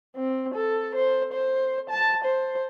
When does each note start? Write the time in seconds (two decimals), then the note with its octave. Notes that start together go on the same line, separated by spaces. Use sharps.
0.16 C4
0.54 A4
0.96 C5
1.33 C5
1.90 A5
2.24 C5